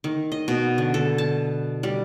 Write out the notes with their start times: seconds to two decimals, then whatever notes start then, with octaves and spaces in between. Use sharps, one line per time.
0.04 D#3
0.32 D#5
0.48 B2
0.78 D3
0.94 A4
1.18 A5
1.83 G3